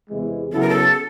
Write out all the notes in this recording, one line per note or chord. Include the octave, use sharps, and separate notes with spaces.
E2 C3 E3 G#3
C#3 F#3 B3 E4 A4
A#4
A4